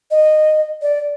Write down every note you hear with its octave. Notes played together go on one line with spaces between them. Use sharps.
D#5
D5